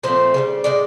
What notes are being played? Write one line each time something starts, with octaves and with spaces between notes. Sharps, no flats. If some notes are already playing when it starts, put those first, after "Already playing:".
A#2 F3 A3 C4 C5
C#3 E3 G3
A2 F3 G#3 D5